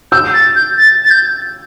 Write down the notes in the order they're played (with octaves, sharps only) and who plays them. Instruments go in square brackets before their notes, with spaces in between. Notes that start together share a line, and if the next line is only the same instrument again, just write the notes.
[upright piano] E6 [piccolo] G6
[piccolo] A6
G6
A6
A6
G6